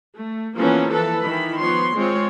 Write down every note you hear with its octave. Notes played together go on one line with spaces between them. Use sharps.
A3
E3 F3 A#3 B3 C#4 A4
E3 A4 B4 A5
D#3 E3 B5
F3 B3 B4 C#5 C6
G#3 C4 F4 C#5